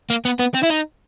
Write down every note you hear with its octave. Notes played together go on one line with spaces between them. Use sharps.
A#3
B3
B3
C4
E4
D#4